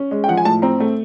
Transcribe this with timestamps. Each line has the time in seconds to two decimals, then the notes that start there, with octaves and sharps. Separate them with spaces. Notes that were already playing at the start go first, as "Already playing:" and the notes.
Already playing: C#4
0.11 G#3
0.24 G5
0.28 F3 F#5
0.37 G#5
0.45 A2 A5
0.62 C4 A#5
0.80 A3